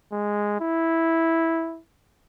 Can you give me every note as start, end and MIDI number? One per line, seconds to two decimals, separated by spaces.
0.12 0.61 56
0.61 1.80 64